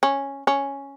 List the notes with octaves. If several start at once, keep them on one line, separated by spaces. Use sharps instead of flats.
C#4
C#4